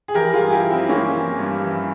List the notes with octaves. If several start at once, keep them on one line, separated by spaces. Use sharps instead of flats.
G#4
E3 G4 A#4
F4 G#4
G2
E4 G4
E3
C4 E4
G2 A#3 C#4
E3
G2
E3